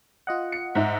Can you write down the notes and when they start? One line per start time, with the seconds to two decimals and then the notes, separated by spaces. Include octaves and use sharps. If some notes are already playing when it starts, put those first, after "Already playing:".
0.27 F4 D#5 F#5
0.52 C#7
0.75 G#2 D#4 E5